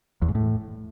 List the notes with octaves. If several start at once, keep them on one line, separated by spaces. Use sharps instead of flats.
E2
G#2
A2